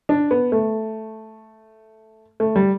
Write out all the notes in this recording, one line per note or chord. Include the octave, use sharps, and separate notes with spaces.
D4
B3
A3
A3
G3